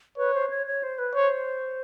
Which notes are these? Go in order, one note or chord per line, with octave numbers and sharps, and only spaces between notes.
B4 C#5
C5
C#5
C#5
C5
B4
C5 C#5